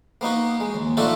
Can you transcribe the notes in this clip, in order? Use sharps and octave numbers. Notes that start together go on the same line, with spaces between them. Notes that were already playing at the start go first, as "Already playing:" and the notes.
A#3 B3 D#4 F#4
G#3
D#2
A3 D4 D#4 F4 F#4 A4